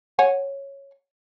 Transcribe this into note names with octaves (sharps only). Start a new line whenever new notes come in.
C#5 F#5 G#5